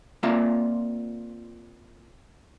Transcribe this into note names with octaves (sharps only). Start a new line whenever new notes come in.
A#3 C4 F4 D5 E5 F5